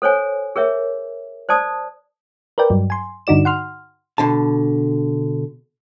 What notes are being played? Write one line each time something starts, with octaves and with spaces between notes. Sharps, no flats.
A4 C5 C#5 G#5
G#4 A#4 C#5 E5
C5 D5 A5 D#6
A#4 B4 D5 G5
G2 F#3
G#5 C6
G2 D3 D#4 F#4 D5 E7
F#5 C6 F6
B2 D3 A5